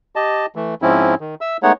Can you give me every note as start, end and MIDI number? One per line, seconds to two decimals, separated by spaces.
0.16 0.46 67
0.16 0.46 75
0.16 0.46 81
0.56 0.75 52
0.56 0.75 57
0.82 1.15 44
0.82 1.15 53
0.82 1.15 60
0.82 1.15 61
0.82 1.15 64
1.20 1.35 51
1.41 1.57 76
1.41 1.57 88
1.63 1.72 56
1.63 1.72 57
1.63 1.72 59
1.63 1.72 63
1.63 1.72 73
1.63 1.72 78